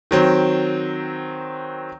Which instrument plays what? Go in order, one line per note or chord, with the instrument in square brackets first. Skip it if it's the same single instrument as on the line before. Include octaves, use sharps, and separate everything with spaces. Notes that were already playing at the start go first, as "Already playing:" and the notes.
[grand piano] D#3 F#3 C4